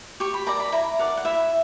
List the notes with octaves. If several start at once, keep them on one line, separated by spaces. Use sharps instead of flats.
G4 C#6
B5
A#4 D5 A#5
B5
E4 A#5
A#4 D5 F#5
F#5
E4 E5